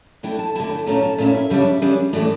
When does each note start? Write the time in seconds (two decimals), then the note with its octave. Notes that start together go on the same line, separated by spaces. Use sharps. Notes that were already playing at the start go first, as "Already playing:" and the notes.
0.23 D3 A3 E4 G5
0.39 A5
0.55 D3 A3 E4 A5
0.70 G5
0.79 A5
0.87 A#2 A3 C#4 E4 A#5
1.02 A5
1.18 A#2 A3 C#4 E4 F5
1.34 E5
1.50 C#3 G3 D4
1.82 C#3 G3 D4
2.13 A2 E3 A3 D5